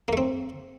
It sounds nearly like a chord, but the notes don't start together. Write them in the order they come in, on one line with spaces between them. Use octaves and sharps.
A#3 A3 C4